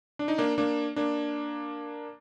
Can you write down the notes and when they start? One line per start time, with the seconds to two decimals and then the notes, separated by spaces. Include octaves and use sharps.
0.19 D4
0.28 D#4
0.38 A#3 D4
0.58 A#3 D4
0.96 A#3 D4